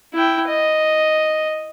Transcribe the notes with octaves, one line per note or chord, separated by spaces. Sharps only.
E4 G5
D#5